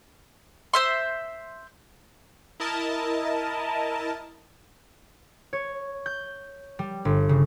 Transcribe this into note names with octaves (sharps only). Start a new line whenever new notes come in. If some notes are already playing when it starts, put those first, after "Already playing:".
C5 E5 C6
E4 A#4 D#5 A5
C#5
G6
G3
G1
C#3